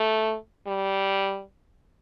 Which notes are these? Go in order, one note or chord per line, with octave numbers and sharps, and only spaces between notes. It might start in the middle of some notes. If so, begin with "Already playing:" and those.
Already playing: A3
G3